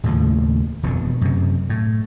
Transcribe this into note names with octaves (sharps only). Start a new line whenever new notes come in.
D#2 A2 C#3 F3
E1 F2 B2 D3
F#2 C3
A2